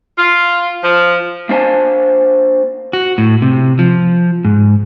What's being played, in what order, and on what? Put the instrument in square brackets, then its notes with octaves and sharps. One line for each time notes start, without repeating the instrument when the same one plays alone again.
[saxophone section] F4
F3
[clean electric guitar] A#3 D4 C5 G#5 A5
[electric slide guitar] F#4
A2
C3
F3
G#2